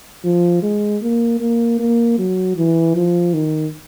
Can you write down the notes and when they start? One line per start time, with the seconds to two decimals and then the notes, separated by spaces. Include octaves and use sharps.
0.24 F3
0.63 G#3
1.02 A#3
1.40 A#3
1.79 A#3
2.18 F#3
2.57 E3
2.96 F3
3.34 D#3